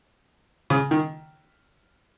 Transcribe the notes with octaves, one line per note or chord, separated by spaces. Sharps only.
C#3
D#3